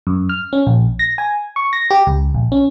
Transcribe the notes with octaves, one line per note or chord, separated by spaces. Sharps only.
F#2
F6
C#4
A#1
A#6
G#5
C#6
A#6
G4
C#2
A#1
C#4